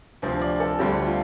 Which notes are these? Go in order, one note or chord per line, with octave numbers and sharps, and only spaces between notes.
D2 C3 F3 C4
D5
A4
D2 D3 G3 C4 G4
F4